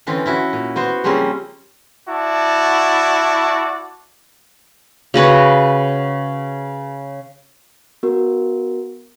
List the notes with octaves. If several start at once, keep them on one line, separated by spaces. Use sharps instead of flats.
D3 E3 C4 C#4
C#4 E4 F#4
A#2
B3 F#4 C5
C#3 F3 G3 A#3 C4 C#4
E4 F#4 D5 A5
C#3 F#4 B4 C#5
B3 F#4 A#4